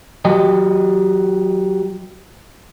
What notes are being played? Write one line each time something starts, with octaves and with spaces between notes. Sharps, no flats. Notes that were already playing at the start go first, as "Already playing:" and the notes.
F#3 G4 D#5